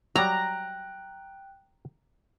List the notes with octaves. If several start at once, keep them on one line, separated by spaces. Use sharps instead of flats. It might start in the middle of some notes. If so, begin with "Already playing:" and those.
F#3 G3 G5 A#5 F#6